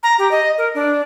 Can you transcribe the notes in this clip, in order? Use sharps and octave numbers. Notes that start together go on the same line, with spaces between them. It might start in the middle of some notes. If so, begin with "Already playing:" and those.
A#5
G4
D#5
A#4
D4